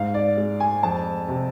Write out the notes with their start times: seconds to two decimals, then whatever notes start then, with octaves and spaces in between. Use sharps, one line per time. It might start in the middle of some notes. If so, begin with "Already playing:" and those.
Already playing: G#2 F5
0.14 D5
0.37 G#3
0.60 G#5
0.83 F2 A5
1.28 C3